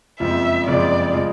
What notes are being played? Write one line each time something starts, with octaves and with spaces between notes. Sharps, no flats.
F#1 F2 C#3 F3 G#3 E5
F#1 F2 C#3 F3 G#3 D5
C#3 F3 G#3